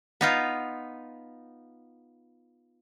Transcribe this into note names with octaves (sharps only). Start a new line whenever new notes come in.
B3 D#4 F4